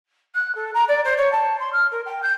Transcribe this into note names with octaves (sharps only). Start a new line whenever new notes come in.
F#6
A4
A#5
D5
C5
C#5
A5
C6
F6
A#4
G5
G6